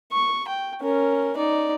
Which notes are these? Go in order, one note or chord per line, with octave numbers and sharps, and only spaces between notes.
C#6
G5
C#4 A#4
D#4 D5